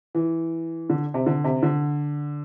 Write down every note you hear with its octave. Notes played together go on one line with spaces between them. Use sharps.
E3
D3
C3
D3
C3
D3